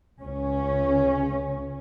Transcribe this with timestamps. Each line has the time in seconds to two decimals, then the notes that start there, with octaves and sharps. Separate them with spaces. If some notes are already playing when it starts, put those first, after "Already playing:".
0.22 C#2 C#3 C#4